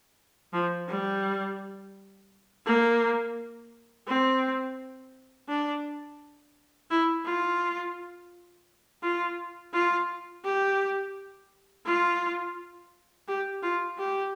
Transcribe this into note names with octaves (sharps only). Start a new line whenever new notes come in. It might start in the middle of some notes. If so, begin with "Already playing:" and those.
F3
G3
A#3
C4
D4
E4
F4
F4
F4
G4
F4
G4
F4
G4